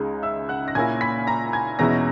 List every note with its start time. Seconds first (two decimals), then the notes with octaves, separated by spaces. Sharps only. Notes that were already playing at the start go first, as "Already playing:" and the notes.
Already playing: C#2 C#3 G#3 D#4
0.23 E5 E6
0.49 F#5 F#6
0.68 A#6
0.75 A#2 A#3 C#4 E4 G#5 G#6
1.01 B5 B6
1.27 A#5 A#6
1.53 G#5 G#6
1.79 E2 B2 G#3 C#4 E4 A#5 A#6